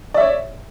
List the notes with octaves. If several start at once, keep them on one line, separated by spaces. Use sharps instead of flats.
C#5 D5 E5